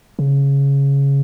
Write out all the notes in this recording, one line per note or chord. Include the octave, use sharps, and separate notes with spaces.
C#3